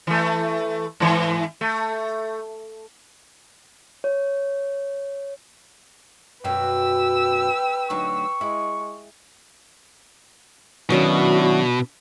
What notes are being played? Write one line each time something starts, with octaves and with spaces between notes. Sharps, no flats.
E3 A3
G#2 E3
A3
C#5
F#2 B2 F#3 B4 G5 E6
D2 F#3 D#4 C#6
G#3 E4
B2 D#3 F#3 C#4 D4 E4 F#4